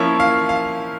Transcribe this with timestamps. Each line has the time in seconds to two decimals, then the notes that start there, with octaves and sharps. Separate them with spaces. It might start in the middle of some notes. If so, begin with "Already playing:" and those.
Already playing: F3 A#3 C#4 E4 C#5
0.20 F5
0.49 F5